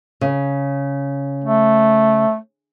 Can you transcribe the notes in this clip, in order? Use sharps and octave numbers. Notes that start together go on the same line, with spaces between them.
C#3
A3